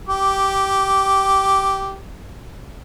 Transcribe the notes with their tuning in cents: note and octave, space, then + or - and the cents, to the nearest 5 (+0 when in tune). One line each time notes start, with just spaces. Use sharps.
G4 -10 D6 +0